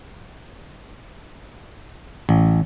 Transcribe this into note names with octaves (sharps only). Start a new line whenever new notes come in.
A1